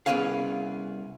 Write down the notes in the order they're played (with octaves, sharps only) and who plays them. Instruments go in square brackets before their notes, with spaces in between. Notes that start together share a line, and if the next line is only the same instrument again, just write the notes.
[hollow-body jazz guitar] C2 A#2 B3 C#4 G#4 F5